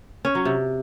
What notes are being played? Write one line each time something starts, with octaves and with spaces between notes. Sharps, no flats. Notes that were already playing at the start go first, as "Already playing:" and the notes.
C#4
F#3
C3